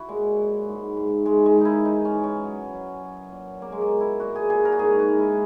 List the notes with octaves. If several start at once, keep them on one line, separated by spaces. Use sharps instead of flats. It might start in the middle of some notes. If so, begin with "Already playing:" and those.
Already playing: E4 F#4
A#2 G#3
F#3
G#2
G#2
G#2 G#3
G#3
D#3
D#4 E4
E3 D#4
C#4
E3
C#4
F#3
F#3
F#3
A#2
B2 A#3
G#3
A#3
B2
E4
A#2 F#4
G#4
A#2 G#4
A#4
F#4
G#2 G#4
F#4
G#2
E4